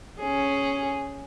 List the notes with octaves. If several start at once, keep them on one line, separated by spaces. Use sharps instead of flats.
C#4 G#4